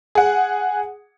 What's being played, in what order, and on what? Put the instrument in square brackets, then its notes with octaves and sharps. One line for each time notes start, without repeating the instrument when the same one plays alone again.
[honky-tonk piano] G#4 F#5